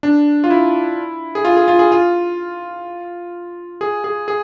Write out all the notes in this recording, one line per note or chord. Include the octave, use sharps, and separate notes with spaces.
D4
F4
E4
G#4
F4
G#4
F4
G#4
F4
G#4
G#4
G#4